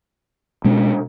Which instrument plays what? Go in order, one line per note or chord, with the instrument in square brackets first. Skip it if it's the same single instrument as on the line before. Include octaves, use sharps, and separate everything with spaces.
[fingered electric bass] B2 G#3 C#4